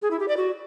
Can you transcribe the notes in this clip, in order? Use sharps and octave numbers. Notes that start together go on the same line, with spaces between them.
G#4
E4
G4
D5
F#4